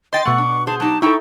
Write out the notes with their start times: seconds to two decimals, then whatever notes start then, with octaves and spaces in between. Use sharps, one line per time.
0.13 C5 D#5 G5 C6 A6
0.25 B2 A3 F#5 C#6
0.38 D4
0.67 G#4 C5 A5
0.80 F#3 D#4 G4 A5
1.02 D#4 E4 A4 G5 A#5 C#6